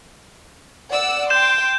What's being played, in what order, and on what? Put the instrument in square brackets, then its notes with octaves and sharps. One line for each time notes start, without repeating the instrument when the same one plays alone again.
[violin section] D5 F#5 E6
[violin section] G5 C6 [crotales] G6 E7